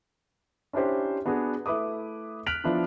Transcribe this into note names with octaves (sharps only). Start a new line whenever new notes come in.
C#4 D4 E4 G4 C5
B3 D4 F#4 G#4
A3 E4 B4 D6 D#6
F6 F#6 B6 D7 F7 F#7
F3 B3 D4 E4 F4